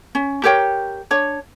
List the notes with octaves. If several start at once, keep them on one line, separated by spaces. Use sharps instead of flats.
C#4
G4 A#4 C#5 G5
D4 C#5